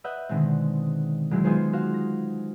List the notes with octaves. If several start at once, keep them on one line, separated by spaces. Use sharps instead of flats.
B4 D#5 E5 F#5 G6
B2 D3 D#3 G#3 C4
E1 F#3 G#3 E4
B3 D#4 F4 G#4 C5
F#4 C5 F5
A#6